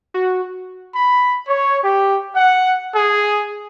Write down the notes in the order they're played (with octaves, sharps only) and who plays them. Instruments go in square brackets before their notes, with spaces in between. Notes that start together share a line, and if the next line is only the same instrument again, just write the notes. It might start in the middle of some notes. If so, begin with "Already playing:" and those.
[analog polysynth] F#4
[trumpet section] B5
C#5
G4
F#5
G#4